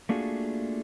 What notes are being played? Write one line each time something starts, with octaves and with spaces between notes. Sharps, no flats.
A3 A#3 D4 F4 F#4 G#4